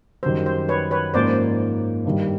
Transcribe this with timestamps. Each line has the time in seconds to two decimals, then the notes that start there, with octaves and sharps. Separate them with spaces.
0.23 F#2 D#3 G3 C5
0.46 C5
0.69 B4 C#5
0.91 B4 C#5
1.14 G#2 F3 A#3 C#4 C5 D5
2.05 G2 D#3 G3